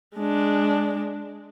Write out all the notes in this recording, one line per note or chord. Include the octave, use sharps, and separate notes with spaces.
G#3 D4